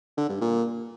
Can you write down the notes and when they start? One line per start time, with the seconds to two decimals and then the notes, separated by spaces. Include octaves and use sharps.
0.17 D3
0.29 G2
0.41 A#2